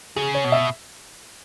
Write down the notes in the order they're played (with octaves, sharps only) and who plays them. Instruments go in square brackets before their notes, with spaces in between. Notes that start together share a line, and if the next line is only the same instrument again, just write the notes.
[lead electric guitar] C#3 [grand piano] G#4
[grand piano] C#5
[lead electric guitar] B2
[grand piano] E5